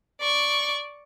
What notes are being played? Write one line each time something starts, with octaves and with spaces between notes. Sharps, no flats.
D5 C#6